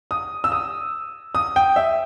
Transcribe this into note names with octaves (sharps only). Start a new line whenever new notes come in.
D#6
E6
D#6
D#6
G5
E5